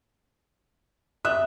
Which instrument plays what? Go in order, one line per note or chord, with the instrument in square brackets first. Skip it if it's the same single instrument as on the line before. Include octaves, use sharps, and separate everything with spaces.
[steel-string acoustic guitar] E5 [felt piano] D#6 F#6 E7